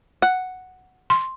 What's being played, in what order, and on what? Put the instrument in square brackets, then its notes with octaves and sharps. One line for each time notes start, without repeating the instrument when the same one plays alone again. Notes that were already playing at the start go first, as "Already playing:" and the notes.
[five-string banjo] F#5
[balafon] C6